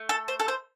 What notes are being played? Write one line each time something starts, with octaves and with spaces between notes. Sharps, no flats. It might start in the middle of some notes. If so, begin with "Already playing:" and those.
Already playing: A3
A4
C5
A4
C5